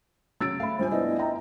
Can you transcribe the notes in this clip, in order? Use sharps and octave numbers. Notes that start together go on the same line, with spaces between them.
C#3 F#3 E6 A6 D7
A3 F5 B5
G2 F3 C5 G#5
B3 D4 E4 D#5
E5 G5 A#5